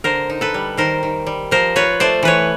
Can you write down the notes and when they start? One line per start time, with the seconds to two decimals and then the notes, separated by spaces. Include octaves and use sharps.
0.04 D3 A#4 C5
0.30 D#4
0.41 A4 B4
0.54 G3
0.77 D#3 A#4 C5
1.03 D#3
1.26 G3
1.51 F3 A#4 C5
1.76 F4 B4 C#5
2.00 A3 C5 D5
2.23 E3 B4 C#5